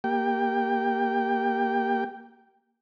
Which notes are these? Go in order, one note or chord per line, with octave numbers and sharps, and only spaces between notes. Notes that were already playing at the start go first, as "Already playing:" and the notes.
A#3 G4 G5